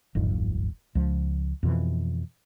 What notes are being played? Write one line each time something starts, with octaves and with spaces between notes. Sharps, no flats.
D1 G1 F2 G#2
C#2 F3
F2 B2 E3